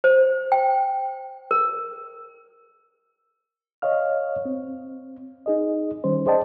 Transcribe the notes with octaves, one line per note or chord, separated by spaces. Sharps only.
C5
G5
A#4
C#5 D#5 F5 F6
C4
D#4 G#4 D#5
D#3 G3 C#4 C5
G#4 C5 D5 D#5 G5 A5